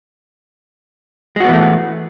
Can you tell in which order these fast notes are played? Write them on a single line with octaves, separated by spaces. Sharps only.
G#3 F#4 B3 E3 A3